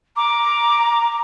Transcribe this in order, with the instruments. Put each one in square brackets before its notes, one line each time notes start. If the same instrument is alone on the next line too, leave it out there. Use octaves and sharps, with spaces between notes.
[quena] A#5 [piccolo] D6